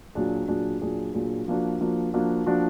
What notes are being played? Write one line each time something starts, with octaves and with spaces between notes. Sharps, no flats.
A#2 F#3 D4 G#4
A#2 F#3 D4 G#4
A#2 F#3 D4 G#4
A#2 F#3 D4 G#4
F3 A#3 D4 F#4
F3 A#3 D4 F#4
F3 A#3 D4 F#4
F3 A#3 D4 F#4